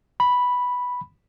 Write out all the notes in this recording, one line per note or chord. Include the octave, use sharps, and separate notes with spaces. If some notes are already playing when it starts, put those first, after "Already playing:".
B5